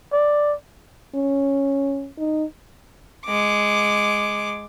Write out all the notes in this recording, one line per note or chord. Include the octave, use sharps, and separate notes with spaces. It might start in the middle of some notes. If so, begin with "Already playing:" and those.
D5
C#4
D#4
G#3 D6